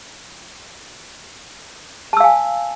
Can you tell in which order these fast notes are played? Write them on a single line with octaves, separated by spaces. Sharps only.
A5 E6 F5 G#5